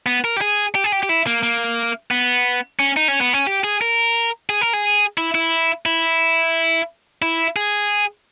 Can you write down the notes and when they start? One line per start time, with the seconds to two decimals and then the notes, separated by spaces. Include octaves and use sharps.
0.06 B3
0.24 A#4
0.37 G4
0.41 G#4
0.75 G4
0.84 G#4
0.92 G4
1.03 G4
1.09 E4
1.27 A#3
1.43 A#3
2.11 B3
2.79 C#4
2.97 D#4
3.08 C#4
3.21 B3
3.33 C#4
3.47 G4
3.64 G#4
3.82 A#4
4.49 G#4
4.61 A#4
4.73 G#4
5.18 E4
5.35 E4
5.86 E4
7.22 E4
7.56 G#4